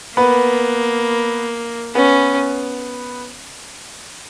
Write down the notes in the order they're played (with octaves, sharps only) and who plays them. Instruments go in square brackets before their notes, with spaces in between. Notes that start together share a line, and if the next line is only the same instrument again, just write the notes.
[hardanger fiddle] A#3 [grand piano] B3 B4
[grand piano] B3 B4 [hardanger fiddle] C#4